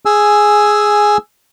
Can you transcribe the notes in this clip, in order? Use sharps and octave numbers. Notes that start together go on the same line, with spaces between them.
G#4 G#5 E6